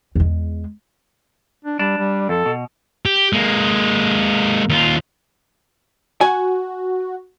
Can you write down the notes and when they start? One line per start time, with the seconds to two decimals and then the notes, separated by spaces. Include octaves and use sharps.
0.15 E2 G#3
1.65 D4
1.79 G3 D4
1.98 G3
2.29 F2 A4
2.46 B2
3.06 G4
3.33 G#3 A#3
4.69 D#2 F4
6.21 F#4 G#5